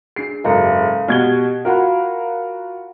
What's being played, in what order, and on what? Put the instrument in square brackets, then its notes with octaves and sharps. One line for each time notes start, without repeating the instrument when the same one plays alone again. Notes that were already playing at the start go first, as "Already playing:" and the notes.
[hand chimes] D4 G#4 [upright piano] C7
[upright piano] F#1 G#2 [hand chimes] A4 F5 A#5
[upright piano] B2 G#6 G7 [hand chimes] G4 F#5 F6
[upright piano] F4 F#4 A#4 [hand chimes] F5 F#5 B5